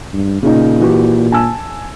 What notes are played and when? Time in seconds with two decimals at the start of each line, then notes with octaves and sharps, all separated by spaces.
0.13 G2
0.43 A#2 C#3 D#4
0.80 E3 F#4 G4
1.32 G#5 A5 E6